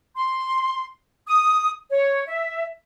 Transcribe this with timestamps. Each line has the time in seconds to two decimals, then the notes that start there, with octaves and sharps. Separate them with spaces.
0.16 C6
1.27 D#6
1.90 C#5
2.28 E5